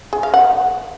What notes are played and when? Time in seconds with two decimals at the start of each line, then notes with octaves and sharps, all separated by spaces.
0.13 G#4
0.23 F5
0.34 F#5